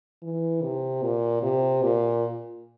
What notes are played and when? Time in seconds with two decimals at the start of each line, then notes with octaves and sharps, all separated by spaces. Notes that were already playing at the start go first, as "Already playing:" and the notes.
0.22 E3
0.63 C3
1.02 A#2
1.43 C3
1.83 A#2